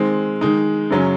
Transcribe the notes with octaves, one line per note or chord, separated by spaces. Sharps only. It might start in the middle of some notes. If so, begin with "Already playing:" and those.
Already playing: D#3 G#3 C4
D#3 G#3 D#4
F#2 C#3 F#3 C#4